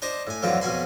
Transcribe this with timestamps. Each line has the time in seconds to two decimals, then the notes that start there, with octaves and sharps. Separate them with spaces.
0.02 D4 C5 D#5 D6
0.27 A2 G#5
0.42 F2 D3 E3 F#3 F4 G5
0.61 F2 B2 C#4 G#5 B5 C6